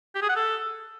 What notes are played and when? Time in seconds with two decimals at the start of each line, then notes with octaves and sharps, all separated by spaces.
0.15 G4
0.22 G#4
0.29 F#5
0.36 A4